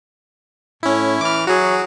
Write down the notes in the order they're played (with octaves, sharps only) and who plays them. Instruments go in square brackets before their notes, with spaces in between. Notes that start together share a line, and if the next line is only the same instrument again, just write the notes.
[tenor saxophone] A2 [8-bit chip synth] C#4 E4
[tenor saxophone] E3 [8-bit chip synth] D6 F6
[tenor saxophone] F#3 [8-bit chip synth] F#4 G#4